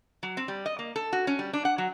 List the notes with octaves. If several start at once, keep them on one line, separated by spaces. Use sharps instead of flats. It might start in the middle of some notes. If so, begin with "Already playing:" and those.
F#3
C4
G3
D#5
A#3
A4
F#4
C#4
G3
D4
F#5
F#3